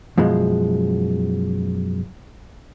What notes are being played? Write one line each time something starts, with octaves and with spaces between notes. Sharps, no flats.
F#2 B2 F3 G#3